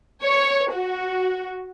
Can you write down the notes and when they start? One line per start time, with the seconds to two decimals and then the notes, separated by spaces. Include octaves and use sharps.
0.23 C#5
0.74 F#4